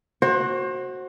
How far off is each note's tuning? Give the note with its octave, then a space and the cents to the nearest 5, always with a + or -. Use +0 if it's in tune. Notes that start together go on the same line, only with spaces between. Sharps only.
F#4 +0 C5 +30